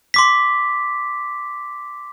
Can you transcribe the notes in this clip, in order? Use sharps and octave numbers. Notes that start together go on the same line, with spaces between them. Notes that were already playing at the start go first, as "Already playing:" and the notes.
C6 D6 B6